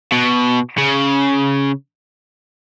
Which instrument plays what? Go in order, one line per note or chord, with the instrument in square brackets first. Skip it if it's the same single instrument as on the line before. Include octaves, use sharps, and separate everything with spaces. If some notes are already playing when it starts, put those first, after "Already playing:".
[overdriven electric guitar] B2
C#3